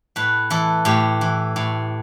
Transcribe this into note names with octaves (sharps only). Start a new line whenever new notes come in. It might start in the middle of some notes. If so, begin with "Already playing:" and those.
A2 B4
E3 A4
A2 G4
E3
A2